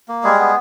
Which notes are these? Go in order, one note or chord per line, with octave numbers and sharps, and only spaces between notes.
A#3
G3 G#3 G#4
B3